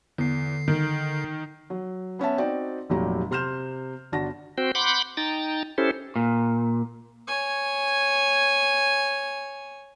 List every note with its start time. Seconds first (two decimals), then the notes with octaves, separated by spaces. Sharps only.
0.18 E2 D3 C7
0.68 D#3
1.70 F#3
2.19 B3 C#4 E5 A5
2.38 C4 D#4 F#4 D5 G5
2.90 F1 A#2 F#3 G4 A#5
3.31 C3 C6 F6 G6 E7
4.12 G1 D4 F#4 A5 A#6
4.58 C4 F#4 C5 G5
4.75 F#5 B5 C6 D6 G6
5.17 D#4 G5 A#5 A6
5.78 C#4 E4 G4 A4 C5
6.16 A#2
7.27 C#5 G#5